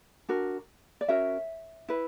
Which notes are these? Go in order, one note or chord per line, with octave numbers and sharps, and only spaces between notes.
D4 F#4 A#4
D5
C#4 F#4 A#4 C#5 E5
E4 B4